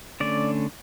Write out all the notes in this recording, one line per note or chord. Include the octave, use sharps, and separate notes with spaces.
D3 A3 C#4 D5